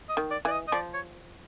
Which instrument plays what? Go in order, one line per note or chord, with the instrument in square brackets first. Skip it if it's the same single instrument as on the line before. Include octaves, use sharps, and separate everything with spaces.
[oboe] D#5
[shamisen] D#3
[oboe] D5
[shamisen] E3 [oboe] D5
[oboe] D#5
D#5
[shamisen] F3 [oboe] D5
[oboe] C#5